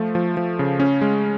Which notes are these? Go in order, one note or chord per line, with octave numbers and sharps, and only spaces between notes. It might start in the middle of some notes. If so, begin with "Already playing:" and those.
Already playing: F3 A3
F3
F3
C#3
C#4
G#3